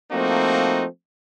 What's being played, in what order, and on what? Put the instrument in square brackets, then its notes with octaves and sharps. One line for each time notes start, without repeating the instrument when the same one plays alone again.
[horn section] F3 A3 A#3 C4 D#4 F#4